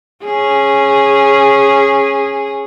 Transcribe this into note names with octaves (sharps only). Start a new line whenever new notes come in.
C#4 G#4